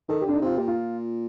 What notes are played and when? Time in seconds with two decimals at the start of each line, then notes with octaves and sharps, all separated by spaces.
0.09 D#3 A4
0.21 G4
0.25 D3 D4
0.34 D#4
0.42 C3 F4
0.57 A#2 G4
0.68 F4